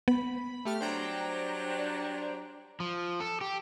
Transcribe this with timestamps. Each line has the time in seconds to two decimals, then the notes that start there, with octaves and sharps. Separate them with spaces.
0.08 B3 B5
0.65 A3 G4 F6
0.81 F#3 G3 D4 C5 G5 A#5
2.80 F3
3.20 A4
3.41 G4